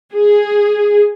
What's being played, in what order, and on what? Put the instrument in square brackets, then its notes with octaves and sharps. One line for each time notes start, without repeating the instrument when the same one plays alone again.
[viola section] G#4